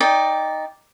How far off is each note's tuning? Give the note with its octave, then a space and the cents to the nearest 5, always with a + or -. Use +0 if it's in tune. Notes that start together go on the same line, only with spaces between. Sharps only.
D#4 +0 D5 -15 G5 +15